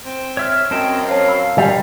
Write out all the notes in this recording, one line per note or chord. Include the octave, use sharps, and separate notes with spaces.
C4
C#5 E5 F6
F#2 C4 D#5 G5 A5 D7 E7
C5 C#5 F5 A5
B5 E6 C7
F#2 G3 F7